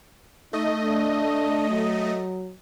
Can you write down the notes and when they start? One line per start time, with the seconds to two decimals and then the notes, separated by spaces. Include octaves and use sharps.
0.53 A3 D#4 D#5
0.82 D4
1.70 F#3